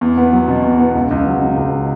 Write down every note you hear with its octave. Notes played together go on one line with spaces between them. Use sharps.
E2
B3
F#3
B2
E2
B3
C#2
C#2
F#3
C#3
C#2